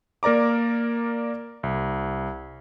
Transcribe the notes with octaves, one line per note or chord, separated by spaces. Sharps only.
A#3 A#4 D5 A#5 D6
C2